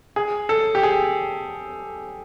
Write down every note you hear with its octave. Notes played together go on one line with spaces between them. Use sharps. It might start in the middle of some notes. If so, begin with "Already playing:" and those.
G#4
A4
G4
G#4